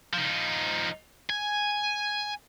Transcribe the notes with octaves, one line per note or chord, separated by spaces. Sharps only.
F3 D#4
G#5